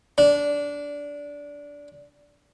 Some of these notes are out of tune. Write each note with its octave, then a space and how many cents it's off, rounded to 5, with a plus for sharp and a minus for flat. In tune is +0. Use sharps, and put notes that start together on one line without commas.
D4 -15